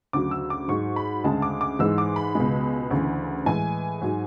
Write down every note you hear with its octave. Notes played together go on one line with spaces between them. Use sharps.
D2 C#3 F#3 D6
E6
D6
G#2 F#3 C#6
B5
D2 C#3 G#3 A5
D6
D6
G#2 E3 G#3 E6
D6
B5
C#2 B2 G#3
D2 C#3 E3
A2 E3 G#3 G#5
G#2 F#3